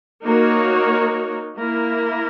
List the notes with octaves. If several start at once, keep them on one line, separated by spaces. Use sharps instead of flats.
A#3 D#4 F#4 A#4 C#5
A#3 E4 A#4